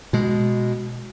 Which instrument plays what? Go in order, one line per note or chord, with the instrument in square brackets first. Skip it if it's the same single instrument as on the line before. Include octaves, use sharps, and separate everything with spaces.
[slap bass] B2 G#3